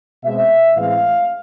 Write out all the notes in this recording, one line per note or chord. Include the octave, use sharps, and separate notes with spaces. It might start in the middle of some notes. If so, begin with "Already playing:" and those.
B2 G#3 C4 E5
A2 E3 G#3 C4 F5